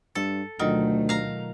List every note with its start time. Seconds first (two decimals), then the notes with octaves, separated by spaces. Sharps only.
0.15 G2 A4
0.59 D2 B2 D#3 F#3 A3 F4
1.09 F5 A#5